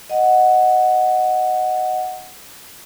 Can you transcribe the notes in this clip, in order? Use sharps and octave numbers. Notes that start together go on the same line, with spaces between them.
D#5 F#5